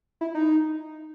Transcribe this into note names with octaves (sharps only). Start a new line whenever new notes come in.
E4
D#4